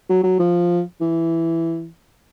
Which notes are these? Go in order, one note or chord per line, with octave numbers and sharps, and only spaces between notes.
F#3
F#3
F3
E3